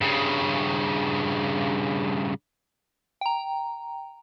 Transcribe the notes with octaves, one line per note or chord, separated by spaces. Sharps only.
G2 C#3
G5 A#5